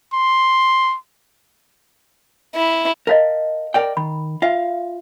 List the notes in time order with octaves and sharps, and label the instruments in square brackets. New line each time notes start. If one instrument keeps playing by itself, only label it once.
[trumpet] C6
[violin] E4
[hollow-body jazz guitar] A#4 [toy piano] D#5 F5 A5
[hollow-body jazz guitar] A#4 D5 G5
[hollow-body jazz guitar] D#3 [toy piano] B5
[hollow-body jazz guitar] F4 F5 [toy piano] E5